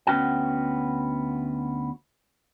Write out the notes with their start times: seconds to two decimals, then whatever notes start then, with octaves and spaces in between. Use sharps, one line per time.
0.07 D2 B3 C#4 F#4 G5